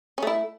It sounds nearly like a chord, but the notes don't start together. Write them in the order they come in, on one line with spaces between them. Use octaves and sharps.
C#4 A3 E4